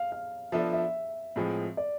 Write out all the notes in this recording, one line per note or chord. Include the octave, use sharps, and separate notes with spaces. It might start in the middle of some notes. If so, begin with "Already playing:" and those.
Already playing: F5
F5
F3 B3 D4 A4 E5
E5
A2 F3 G#3 C4 G#4
D5